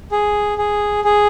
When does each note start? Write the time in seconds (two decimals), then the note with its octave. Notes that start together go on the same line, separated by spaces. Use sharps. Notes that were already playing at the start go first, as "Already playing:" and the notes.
0.12 G#4
0.58 G#4
1.04 G#4